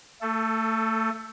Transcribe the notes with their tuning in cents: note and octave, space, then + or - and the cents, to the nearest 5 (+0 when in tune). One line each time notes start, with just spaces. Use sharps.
A3 +25 A4 +0